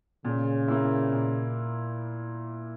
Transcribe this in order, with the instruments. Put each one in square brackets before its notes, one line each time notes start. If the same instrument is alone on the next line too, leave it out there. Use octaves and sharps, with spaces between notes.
[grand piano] A#2 [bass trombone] C#3
[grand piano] A#3 E4
A#2